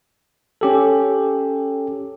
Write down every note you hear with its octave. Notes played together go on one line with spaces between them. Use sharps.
C#4 G4 A4